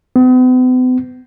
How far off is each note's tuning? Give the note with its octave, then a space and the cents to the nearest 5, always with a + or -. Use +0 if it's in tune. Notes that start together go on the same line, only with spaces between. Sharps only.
B3 +45